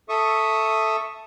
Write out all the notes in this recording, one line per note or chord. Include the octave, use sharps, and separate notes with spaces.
A4 E5 C#6 D#6